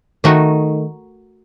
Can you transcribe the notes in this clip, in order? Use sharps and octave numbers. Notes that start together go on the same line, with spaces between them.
D#3 A3 D#4 F#4